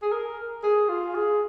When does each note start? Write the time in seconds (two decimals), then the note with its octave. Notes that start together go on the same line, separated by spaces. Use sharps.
0.02 G#4
0.12 A#4
0.63 G#4
0.89 F4
1.14 G#4